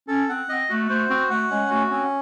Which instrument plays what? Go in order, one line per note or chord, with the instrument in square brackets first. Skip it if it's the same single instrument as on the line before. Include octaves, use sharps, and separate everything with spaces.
[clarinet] C#4 [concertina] A4
[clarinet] C4 [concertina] F#5
[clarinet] C4 [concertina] D#5
[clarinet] A3 [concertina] F#4
[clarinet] A3 [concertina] C5
[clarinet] C4 [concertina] F#4
[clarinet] A3 [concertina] F#5
[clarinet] G#3 [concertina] C#4
[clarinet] A3 [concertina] F#4
[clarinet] C4 [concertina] C#4